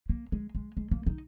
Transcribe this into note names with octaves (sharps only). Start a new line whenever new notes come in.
A#3
G#3
G#3
G#3
A#3
D#4